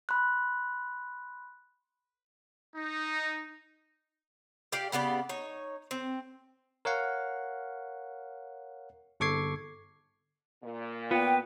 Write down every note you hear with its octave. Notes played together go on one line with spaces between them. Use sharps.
B5 C6 F#6
D#4
G4 D5 F5
C#3 B3 G4 D5
D#4 C#5
C4
A#4 C#5 F5 F#5
G1 A4 C#6 D6 G#6 C7
A#2
B3 F4 B4 G5